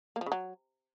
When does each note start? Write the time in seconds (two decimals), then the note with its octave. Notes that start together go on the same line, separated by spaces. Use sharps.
0.16 A#3
0.21 F3
0.26 C#3
0.32 F#3